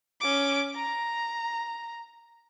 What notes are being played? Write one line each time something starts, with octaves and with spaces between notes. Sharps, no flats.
C#4 D6
A#5